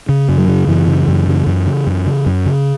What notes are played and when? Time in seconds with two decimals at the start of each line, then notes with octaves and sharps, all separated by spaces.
0.09 C#3
0.28 F#2
0.38 F#3
0.48 C#3
0.67 F#2 E3
0.87 C#3
1.08 F#2
1.27 C#3
1.47 F#2
1.66 C#3
1.86 F#2
2.06 C#3
2.26 F#2
2.46 C#3